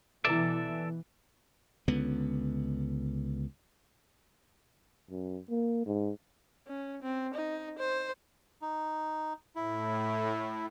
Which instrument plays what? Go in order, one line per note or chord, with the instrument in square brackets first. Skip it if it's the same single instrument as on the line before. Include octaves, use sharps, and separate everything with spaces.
[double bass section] B2 E3 [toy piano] E4 B4 D6 [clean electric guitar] A4 D5 E5
[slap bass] C#2 D3 B3
[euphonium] F#2
A#3
G#2
[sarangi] C#4
C4
D#4
C5
[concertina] D#4
[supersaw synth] A2 [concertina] E4